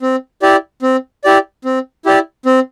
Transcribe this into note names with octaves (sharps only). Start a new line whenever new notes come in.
C4
E4 G4 D5
C4
E4 G4 D5
C4
E4 G4 D5
C4